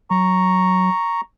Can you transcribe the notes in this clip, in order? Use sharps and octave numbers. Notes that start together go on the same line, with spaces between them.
F#3 A#5 C#6